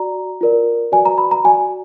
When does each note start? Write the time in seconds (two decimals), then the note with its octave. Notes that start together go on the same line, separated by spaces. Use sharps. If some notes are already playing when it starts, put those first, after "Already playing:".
Already playing: F#4 D5 A#5
0.41 F4 A#4 D5
0.92 F#4 B4 D5 G#5
1.05 A#5
1.18 B5
1.31 A#5
1.44 F#4 D5 G#5